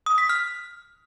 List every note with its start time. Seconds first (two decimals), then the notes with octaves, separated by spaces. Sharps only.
0.06 D#6
0.18 B6
0.29 F6